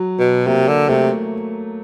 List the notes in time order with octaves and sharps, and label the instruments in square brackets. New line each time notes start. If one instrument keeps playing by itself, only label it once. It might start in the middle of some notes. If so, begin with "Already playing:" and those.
Already playing: [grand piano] F#3
[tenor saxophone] B2
[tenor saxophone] C3 [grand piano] A#3
[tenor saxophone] D3
[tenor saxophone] C3 [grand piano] A3